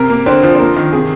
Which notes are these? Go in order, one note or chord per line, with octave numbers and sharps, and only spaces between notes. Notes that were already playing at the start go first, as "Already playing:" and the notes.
Already playing: C3 A#4
A#3
D3 C4 C5
F3
C5
A#3 A#4
D#3
C3 G#4